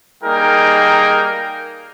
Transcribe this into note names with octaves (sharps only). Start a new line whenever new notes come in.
G3 A#3 D#4 G#4 A#4 G5